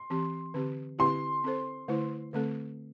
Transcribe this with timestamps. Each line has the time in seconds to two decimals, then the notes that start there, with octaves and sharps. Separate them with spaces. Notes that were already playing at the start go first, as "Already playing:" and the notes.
Already playing: C6
0.10 E3 C4 G4
0.54 D3 C4 G4
0.99 D3 C4 E4 G4 C6
1.44 C4 A4 C5
1.88 D3 A3 E4 C5
2.33 D3 A3 C4 A4